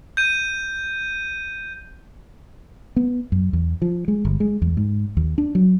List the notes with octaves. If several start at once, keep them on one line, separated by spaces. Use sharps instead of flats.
G6 D#7
B3
F#2
E2
F3
G#3
G1
G#3
E2
G#2
D#2
D4
F#3